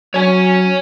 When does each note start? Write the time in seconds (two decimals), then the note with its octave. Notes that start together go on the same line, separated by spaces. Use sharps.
0.14 F#3 C#5 G#5